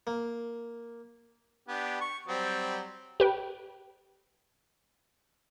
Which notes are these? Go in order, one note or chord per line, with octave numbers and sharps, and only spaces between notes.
A#3
B3 D4 G4
C#6
F#3 G3 C4
G4 B4 G5